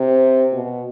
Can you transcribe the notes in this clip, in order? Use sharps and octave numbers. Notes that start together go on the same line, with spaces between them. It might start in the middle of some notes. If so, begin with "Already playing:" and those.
Already playing: C3
B2